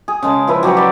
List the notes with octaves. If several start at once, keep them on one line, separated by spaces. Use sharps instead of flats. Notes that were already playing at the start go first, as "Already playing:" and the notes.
G#4
C#3 G#3 A5
F3 E4 B4
F#3 G4 F#5 B5
D5 B5